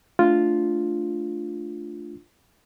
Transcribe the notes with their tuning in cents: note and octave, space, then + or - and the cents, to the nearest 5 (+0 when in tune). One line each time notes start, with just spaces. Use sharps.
A3 +0 D4 +0 F4 +0